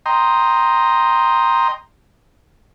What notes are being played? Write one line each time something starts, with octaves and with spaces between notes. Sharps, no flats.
D#5 G5 A#5 C6